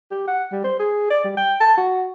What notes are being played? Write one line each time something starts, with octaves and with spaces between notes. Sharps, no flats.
G4
F#5
G3
C5
G#4
D5
G3
G5
A5
F#4